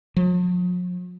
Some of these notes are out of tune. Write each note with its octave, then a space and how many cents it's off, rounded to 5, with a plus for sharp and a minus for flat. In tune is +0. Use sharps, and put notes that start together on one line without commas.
F3 +45